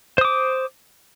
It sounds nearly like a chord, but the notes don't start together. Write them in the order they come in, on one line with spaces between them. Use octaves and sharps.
C5 D#6 D6